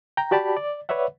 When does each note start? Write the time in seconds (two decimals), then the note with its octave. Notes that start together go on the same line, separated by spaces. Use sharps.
0.17 G5 A#5
0.31 F#4 G4 D5 A5 B5
0.57 D5
0.89 B4 C#5 D5 E5 F#5